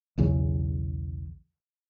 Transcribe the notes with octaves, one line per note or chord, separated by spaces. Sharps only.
B1 E2 C#3 F#3